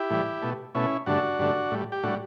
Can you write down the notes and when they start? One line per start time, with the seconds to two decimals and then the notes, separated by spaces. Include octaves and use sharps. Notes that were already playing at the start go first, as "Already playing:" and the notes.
Already playing: E4 G4
0.10 A2 E3 G3
0.42 B2 A3
0.75 B2 A3 C#4 E4
1.06 G2 D3 A3 D4 F#4
1.39 G2 D3 A3
1.71 A2 G3
1.92 G4
2.03 A2 G3 D4 F#4